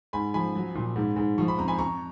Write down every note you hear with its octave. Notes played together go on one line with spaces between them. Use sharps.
G#2 G#5 B5
F3 G#5 B5
F#3
A#2
G#2
G#2
F3 C#6
B5
F2 A#5
G#5 B5
F2 A#5 C#6